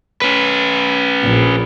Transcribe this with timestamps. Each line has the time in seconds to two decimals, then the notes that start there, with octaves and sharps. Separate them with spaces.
0.22 C#4 B4
1.21 A#1